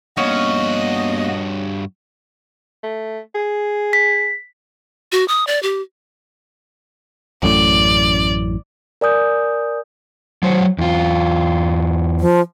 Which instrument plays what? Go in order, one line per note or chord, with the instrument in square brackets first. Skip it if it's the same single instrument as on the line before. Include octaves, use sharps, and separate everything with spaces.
[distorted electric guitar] G2 F#4 [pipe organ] A#3 B3 [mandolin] C#4 [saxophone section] D#5
[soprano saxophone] A3
G#4
[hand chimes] B6
[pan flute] F#4
D#6
D5
G4
[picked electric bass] A1 F#2 A2 [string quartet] D5
[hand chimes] A#4 D5 G#5 D#6 G6
[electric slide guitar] F#3 C5 C#5
E2 F4
[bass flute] F3